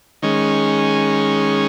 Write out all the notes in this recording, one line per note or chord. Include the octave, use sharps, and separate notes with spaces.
D#3 G#3 C#4